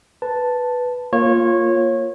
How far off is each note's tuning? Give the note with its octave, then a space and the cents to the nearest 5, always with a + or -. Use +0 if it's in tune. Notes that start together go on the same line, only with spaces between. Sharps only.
B4 +0 A5 +0
A#3 +0 F4 +0 C#5 -20